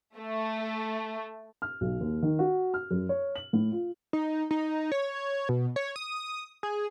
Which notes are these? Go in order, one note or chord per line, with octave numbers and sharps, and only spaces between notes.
A3
F6
B1
D#2
D#3
F#4
F6
F#2
C#5
F#7
A2
F4
D#4
D#4
C#5
B2
C#5
D#6
G#4